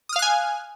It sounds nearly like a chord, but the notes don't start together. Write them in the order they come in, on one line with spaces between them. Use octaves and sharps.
D#6 F6 F5 F#6 G#5